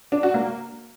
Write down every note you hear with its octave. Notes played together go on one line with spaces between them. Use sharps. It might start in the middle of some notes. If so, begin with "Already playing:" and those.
D4
F#4
A#3